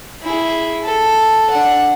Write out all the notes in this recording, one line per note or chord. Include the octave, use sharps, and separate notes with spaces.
E4 G#4
A4
D4 F#5